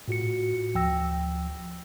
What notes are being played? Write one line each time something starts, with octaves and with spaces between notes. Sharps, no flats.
A2 F4 F#4 C#7
D2 F3 G5 E6 A#6